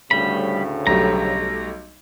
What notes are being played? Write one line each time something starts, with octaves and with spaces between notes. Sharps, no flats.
D2 A2 C#3 G3 B5
B1 G3 A3 A#5